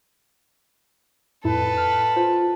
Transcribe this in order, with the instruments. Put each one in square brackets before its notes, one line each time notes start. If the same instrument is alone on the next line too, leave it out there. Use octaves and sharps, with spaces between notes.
[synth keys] F2 A2 E4 [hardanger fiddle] A4 B4
[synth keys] F6
F4 C5